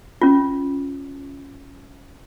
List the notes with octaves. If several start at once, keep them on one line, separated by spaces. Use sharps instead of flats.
C#4 F4